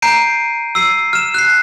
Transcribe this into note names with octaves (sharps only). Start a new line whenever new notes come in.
A#5 G6 C7 D7 D#7
E6 C7 D#7
F6 E7
F#6 C7